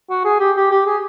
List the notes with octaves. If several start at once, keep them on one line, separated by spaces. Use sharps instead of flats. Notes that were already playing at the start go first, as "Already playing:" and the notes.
F#4
G#4
G4
G4
G4
G#4